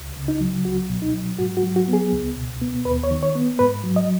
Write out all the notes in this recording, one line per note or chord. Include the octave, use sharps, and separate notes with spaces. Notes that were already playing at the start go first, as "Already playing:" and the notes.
Already playing: C#2
C#3
D#4
F#3
C#2 F#4
B2
D#4
F#3
G#2 F#4
F#4
F#3
F#4
B3
G#4
C#2
B2
B3
D#2 B4
C#5
D#3
C#5
B3
G#2 B4
F#3
D#5